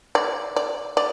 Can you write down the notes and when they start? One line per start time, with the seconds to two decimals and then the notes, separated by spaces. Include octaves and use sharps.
0.15 D5
0.56 D5
0.97 D5